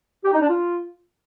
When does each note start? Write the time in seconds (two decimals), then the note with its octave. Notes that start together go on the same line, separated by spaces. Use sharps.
0.25 G4
0.33 D#4
0.41 D4
0.49 F4